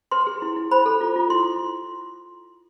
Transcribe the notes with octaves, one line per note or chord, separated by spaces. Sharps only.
B4 C6
G#4
E4
E4
C5 B5
A4
F4
F4
E4 C6